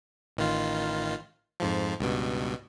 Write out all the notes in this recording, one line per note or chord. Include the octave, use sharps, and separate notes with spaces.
A1 D#3 F4
F2 G#2 F3
C#2 G2 B2